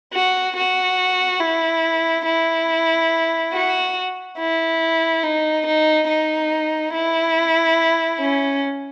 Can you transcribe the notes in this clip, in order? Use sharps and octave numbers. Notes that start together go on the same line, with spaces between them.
F#4
F#4
E4
E4
F#4
E4
D#4
D#4
D#4
E4
C#4